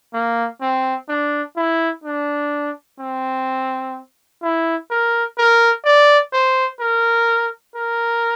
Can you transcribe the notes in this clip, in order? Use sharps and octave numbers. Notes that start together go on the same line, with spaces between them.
A#3
C4
D4
E4
D4
C4
E4
A#4
A#4
D5
C5
A#4
A#4